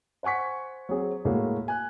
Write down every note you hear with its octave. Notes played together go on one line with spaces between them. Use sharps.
C5 F#5 G#5 C#6 B6
F#3 C4 G#4
A2 G#3 A#3 F#4
G#5 F#6